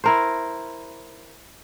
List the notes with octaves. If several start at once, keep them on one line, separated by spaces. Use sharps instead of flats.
E4 A#4 C5